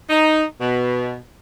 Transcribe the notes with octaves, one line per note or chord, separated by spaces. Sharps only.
D#4
B2